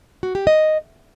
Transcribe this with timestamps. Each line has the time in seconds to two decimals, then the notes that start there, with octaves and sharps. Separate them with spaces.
0.23 F#4
0.35 G4
0.47 D#5